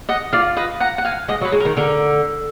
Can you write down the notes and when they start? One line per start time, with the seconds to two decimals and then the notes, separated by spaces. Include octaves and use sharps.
0.09 D#5 F#5
0.33 F4 D5 F5
0.57 B4 D#5
0.80 F#5 A#5
0.98 F#5
1.05 F5 G#5
1.28 G#3 D#5 F#5
1.41 F#3
1.45 B4
1.52 G#3
1.60 A#4
1.65 D#3
1.77 D3 A#4